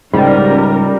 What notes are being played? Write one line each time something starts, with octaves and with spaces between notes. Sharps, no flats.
C#2 G#2 G3 C#4 A#4